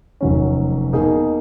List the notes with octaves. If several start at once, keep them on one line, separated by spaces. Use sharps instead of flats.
F1 F2 D#3 F#3 C#4
B2 A#3 D#4 G#4